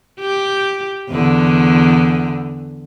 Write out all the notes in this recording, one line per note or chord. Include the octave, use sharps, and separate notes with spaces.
G4
E2 D3